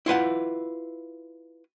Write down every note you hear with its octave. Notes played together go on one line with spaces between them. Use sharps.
E4 F4 B4 F#5